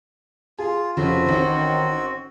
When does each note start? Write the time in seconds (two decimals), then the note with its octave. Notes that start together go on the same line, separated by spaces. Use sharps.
0.59 F4 G#4
0.97 F1 C#3 F3 C4 F#4
1.26 A1 D#3 C5